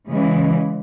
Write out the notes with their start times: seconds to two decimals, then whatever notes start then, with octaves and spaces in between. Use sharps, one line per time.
0.11 C#3 E3 G#3